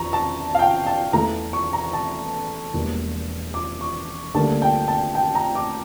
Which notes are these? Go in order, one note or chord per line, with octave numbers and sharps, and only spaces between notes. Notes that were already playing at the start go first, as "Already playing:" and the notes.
Already playing: E2 E3 A#5 C#6
A5
F5
G5
A5
E2 E3 A3 A#5
C#6
A#5
A5
E1 E2 E3 G3 A#3
D6
C#6
D2 D3 G3 A#3 A5
G5
A5
G5
A#5
D6